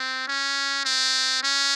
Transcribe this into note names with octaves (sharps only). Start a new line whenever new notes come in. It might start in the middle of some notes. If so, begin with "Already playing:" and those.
Already playing: C4
C#4
C4
C#4